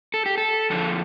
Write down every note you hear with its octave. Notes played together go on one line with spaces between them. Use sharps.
A4
G4
A4
F2 D3 F3 A4